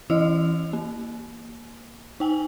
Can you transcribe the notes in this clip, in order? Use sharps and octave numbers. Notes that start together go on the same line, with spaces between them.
E3 E4 D#5 E6 F6 F7
A#3
D#4 G5 G#5